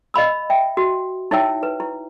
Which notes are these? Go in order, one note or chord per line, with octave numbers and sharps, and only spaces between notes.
D#5 F5 B5 E6
E5 G5
F#4
D#4 E4 C#5 E5 G5 E6
B4
E4